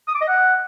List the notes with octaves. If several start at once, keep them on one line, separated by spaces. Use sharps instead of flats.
D#6
D6
D#5
F#5